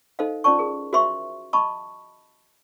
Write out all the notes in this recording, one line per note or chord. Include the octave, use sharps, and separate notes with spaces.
D#4 A4 C5 D#5 F5
C#4 F4 C5 D5 A5 C#6
G#4 A#4
F#4 A#4 C5 E5 C6 C#6
D#5 A5 B5 C#6 D#6